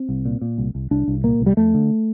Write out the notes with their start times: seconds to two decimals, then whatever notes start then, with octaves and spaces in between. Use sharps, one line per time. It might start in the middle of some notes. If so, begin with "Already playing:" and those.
Already playing: C4
0.09 C2
0.25 A#2
0.41 A#2
0.58 C2
0.75 C2
0.91 C2 D4
1.08 C2
1.24 A#2 A#3
1.40 C2
1.46 G3
1.57 F2 A3
1.74 D3